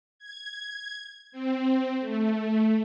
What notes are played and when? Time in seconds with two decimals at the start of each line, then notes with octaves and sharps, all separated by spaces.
0.19 G#6
1.32 C4
2.00 A3